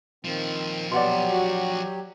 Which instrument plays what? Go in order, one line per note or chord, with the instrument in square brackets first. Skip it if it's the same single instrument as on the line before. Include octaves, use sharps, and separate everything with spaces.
[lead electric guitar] A#2 F3 [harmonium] D#3 C4
[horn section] B2 [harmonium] F#3 G4 [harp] D5 F#5 C6
[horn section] F#4